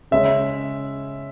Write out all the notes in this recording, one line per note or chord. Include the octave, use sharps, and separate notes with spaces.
C#3 G#3 C#4 E5